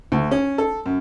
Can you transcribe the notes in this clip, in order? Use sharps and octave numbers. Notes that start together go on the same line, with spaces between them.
D2
C#4
A4
F#2